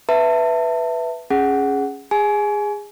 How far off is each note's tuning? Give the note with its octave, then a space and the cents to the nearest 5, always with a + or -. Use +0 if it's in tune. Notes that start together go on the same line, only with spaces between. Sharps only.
B4 +0 E5 +5 A5 +30
C#4 +0 G#4 +0 F#5 +10
G#4 -20 G#5 +25